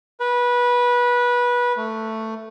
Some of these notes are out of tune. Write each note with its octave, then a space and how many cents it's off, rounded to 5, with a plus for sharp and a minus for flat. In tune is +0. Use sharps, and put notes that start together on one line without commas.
B4 -20
A3 +10